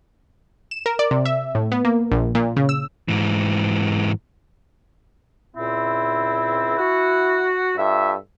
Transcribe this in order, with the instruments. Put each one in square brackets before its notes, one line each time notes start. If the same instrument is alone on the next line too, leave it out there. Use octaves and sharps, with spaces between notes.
[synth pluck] E7
A#4
D5
C3
E5
A2
B3
A#3
A#1
A#2
C#3
E6
[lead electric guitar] G#2 E3
[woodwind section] C#2 A#2 C4 [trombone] E4
[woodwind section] F#4
[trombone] G2 [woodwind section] F4 A4 E5